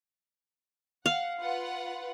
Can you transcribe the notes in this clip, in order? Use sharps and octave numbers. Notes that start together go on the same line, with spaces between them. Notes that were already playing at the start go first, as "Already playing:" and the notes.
F5 F#5
F4 B4 F#5